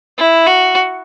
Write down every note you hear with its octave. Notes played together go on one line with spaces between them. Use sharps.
E4
F#4